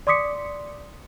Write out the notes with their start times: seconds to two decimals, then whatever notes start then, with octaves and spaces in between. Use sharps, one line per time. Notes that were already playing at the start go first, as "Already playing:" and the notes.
0.07 D5 C6 D6 D#6 B6 C#7